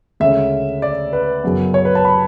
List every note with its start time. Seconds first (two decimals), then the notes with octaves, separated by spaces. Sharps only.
0.20 D2 C#3 G#3 C#4 E5
0.82 D5
1.13 B4
1.43 F#2 C#3 F#3 B3
1.74 C#5
1.85 B4
1.95 A5
2.05 B5